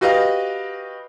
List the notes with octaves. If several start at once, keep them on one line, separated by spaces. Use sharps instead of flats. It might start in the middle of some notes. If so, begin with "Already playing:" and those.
F#4 G4 B4 D#5 F5